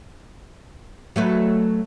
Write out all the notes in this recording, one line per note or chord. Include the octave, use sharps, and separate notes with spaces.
F#3 A3 B4